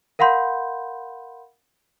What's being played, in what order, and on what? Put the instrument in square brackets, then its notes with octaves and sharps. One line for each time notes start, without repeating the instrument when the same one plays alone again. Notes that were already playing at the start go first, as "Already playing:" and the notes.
[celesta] A#4 F5 F#5 B5 C6 G6